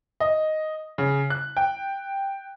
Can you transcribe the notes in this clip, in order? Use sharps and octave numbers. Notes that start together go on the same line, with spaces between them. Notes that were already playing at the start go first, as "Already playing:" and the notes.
D#5
C#3
F#6
G5